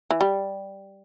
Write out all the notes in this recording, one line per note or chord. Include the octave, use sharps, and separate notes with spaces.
E3
G3